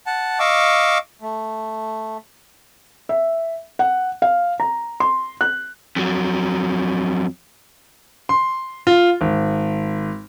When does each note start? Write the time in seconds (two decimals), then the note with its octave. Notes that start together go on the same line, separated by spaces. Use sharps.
0.07 F#5 A5
0.39 D#5 F5 C#6 D6 E6
1.22 A3
3.09 E5
3.79 F#5
4.22 F5
4.60 A#5
5.00 C6
5.41 F#6
5.96 F2 F#3
8.29 C6
8.87 F4
9.21 G#1